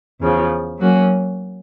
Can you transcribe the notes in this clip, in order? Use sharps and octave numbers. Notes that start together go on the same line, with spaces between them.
E2 C#3 F3
F#3 A#3 C#4 F#4